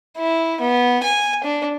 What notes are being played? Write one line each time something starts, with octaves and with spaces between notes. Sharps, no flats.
E4
B3
G#5
D4